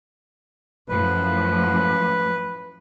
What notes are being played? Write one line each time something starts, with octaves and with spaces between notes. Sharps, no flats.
F#2 A2 F3 B4